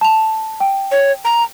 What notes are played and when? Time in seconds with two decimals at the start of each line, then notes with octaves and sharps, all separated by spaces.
0.01 A5 F7
0.60 G5
0.91 C#5
1.25 A#5